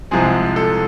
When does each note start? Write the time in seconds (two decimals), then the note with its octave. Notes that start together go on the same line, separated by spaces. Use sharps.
0.11 C2 C3 F3 G#3 C4 G#4
0.56 A4